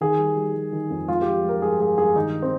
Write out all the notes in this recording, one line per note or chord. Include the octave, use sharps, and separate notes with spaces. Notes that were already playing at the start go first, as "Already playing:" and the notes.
D#3 G#4
G3
G3
G3
D#3
F2
G#3 F4
G4
F3
G#3 A#4
G2 G#4
G#3 G#4
G2 G#4
D#3 D#4
C4